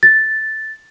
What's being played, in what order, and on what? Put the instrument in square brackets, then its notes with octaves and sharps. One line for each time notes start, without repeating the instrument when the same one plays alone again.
[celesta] A6